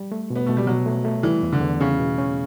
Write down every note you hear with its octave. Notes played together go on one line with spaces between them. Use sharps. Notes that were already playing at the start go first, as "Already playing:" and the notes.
Already playing: G3
A3
B2
B3
B2 A3
G3
B2 F#3
A3
A3
E3 G3
E2
D3
E2
C#3 C#4
B2
C#4